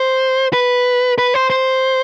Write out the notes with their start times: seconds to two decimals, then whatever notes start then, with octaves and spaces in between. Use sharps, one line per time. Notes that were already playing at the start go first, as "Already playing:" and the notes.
Already playing: C5
0.53 B4
1.18 B4
1.34 C5
1.50 C5